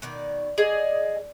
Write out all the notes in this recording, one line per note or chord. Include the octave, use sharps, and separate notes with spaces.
B2 D#3 D5
G#4 D5 D#5